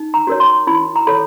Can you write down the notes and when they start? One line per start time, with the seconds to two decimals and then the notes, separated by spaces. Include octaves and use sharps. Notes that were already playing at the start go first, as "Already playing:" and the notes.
Already playing: D#4
0.14 A#5
0.27 F#4 A#4 C#5
0.40 C6
0.67 E4 B5
0.96 A#5
1.07 A4 C#5 B5